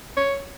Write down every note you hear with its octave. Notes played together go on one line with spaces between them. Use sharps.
C#5